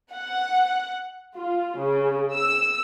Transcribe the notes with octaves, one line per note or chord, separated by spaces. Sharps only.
F#5
F4
C#3
E6